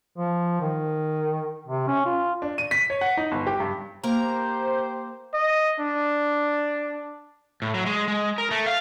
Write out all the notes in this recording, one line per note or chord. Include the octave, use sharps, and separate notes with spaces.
F3
D#3
C3
C#4
F4
D4
D#7
B6
C#5
F#5
D#4
G1
G4
G2
A#3 G4 A#4 C5 A#5
D#5
D4
A2
F#3
G#3
G#3
A#4
A3
F5